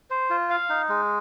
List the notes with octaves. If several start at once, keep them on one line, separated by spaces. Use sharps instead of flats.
C5
F4
F5
D#4
G#3